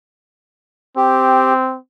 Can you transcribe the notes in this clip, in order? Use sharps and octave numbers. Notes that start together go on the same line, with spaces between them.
C4 G4